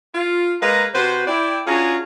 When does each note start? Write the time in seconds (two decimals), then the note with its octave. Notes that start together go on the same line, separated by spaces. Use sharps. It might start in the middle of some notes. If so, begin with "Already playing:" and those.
0.15 F4
0.62 G#3 A#3 B4 F5 A#5
0.94 C3 F#4 B4 C5
1.27 E4 D5 G5
1.66 C#4 D4 F4 F#4 G#4 A#5